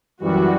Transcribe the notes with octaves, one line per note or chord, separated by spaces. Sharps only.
F#2 E3 G3 F#4